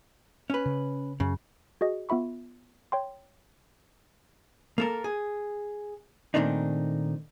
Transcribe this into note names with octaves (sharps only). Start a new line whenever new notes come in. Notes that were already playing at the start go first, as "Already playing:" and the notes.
C#4 B4
C#3
F#2 C#3
F#4 G#4 D#5
B3 F4 E5 B5 C#6
C#5 G5 C6
A#3 A4 A#4
G#4
A#2 D#3 A3 C4 D4 D#4